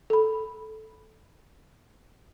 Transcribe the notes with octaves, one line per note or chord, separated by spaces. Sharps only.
A4 B5